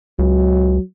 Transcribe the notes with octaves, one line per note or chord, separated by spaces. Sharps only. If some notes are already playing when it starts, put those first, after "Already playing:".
C#2 F#3